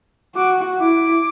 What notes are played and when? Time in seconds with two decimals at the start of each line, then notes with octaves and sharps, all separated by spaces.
0.35 F#4 D6
0.79 E4 D6